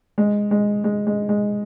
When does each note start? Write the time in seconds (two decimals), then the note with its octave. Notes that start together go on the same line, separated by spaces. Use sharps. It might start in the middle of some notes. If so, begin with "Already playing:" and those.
0.18 G#3
0.51 G#3
0.84 G#3
1.07 G#3
1.29 G#3